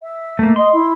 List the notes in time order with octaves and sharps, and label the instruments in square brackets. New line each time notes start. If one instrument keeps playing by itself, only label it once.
[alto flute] E5
[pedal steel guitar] A3 A#3
[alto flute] D#5 [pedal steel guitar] C6
[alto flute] E4